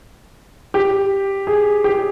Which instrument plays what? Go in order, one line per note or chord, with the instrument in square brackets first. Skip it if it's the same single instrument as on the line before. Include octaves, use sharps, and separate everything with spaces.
[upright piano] G4
G#4
G4